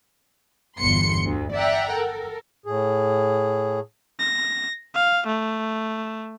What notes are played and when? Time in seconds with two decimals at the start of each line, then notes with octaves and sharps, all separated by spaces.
0.78 G1 E2 C6 C#7
1.26 D2
1.54 D5 E5 F#5 G5 A#5
1.93 A4 A#4
2.66 A2 G#4
4.19 A#6
4.95 F5
5.27 A3